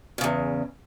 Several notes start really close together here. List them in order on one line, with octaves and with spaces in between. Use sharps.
A#2 C#3 E2